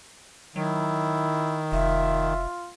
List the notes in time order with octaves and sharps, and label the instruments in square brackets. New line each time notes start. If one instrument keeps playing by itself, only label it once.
[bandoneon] D#3 [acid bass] F#3 [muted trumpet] E4
[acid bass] F1 [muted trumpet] F4 [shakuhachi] E5